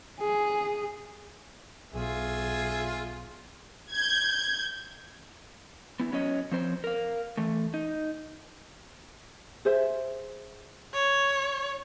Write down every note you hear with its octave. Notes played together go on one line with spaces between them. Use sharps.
G#4
B1 F4 G#4 E5
G6 G#6
B3 E4
F#3 C#4 C#5 D#5
F3 C4 C5 C#5
A#4 F5
E3 A3
D#4
G#4 C5 E5
C#5